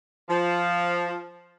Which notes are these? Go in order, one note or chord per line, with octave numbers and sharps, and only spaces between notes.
F3